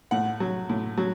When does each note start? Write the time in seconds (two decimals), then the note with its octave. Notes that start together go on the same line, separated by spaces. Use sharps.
0.11 A2 F#5
0.40 F#3
0.69 A2
0.98 F#3